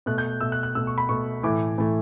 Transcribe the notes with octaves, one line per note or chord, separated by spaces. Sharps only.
B2 A3 F#6
G6
B2 A3 E6
F#6
F#6
B2 A3 E6
C#6
B5
B2 A3 C#6
A2 E3 A3 D6
A2 E3 A3